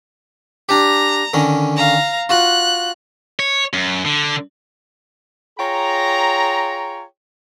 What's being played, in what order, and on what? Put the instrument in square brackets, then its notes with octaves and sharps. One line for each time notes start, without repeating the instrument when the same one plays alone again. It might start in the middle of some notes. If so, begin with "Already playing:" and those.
[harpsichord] D4 G4 [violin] A#5
[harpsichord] D3 D#3 C#4
[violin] F5 A#5
[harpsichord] F4 F#4 [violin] F#6
[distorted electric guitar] C#5
F#2
D3
[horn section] F4 G#4 C#5 G5 A#5